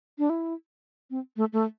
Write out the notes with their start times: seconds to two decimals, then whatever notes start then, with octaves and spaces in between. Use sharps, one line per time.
0.19 D4
0.30 E4
1.11 C4
1.37 A3
1.53 A3